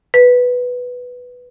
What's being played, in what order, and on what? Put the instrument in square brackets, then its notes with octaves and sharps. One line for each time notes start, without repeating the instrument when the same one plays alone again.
[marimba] B4